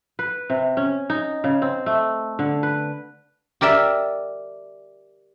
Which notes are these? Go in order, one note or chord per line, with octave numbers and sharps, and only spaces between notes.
B4
C3
C#4
D#4
C#3
C4
A3
D3
B4
G4 A#4 D5 E5